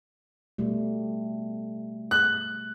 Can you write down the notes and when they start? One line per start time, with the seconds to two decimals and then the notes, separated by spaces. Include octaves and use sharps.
0.58 B2 G3 A3
2.11 F#6